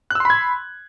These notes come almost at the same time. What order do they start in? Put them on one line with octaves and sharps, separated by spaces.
F#6 E6 C6 B5 G#6